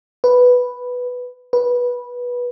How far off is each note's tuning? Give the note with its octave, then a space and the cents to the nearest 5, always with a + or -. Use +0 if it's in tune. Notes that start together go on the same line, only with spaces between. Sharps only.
B4 +0
B4 -15